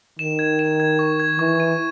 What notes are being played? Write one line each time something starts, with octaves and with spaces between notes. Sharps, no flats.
D#3 E7
G#6
E7
G#6
C#6
G#6
E3 C#6
D#7